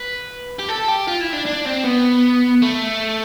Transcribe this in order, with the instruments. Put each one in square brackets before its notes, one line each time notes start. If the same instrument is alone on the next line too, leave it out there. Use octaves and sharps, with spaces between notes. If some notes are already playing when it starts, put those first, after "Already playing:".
Already playing: [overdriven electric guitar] B4
G4
A4
G4
F4
E4
D4
D4
C4
B3
A3